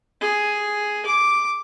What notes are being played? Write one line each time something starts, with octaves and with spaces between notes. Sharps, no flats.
G#4
D6